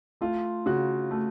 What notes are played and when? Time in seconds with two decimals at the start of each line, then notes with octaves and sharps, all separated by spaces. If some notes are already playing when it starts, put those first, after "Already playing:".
0.21 A3 F4
0.66 C#3 F#4
1.11 A3